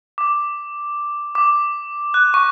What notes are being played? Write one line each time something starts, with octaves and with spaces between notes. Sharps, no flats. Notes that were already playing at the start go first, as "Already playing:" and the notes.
D6
D6
F#6
C#6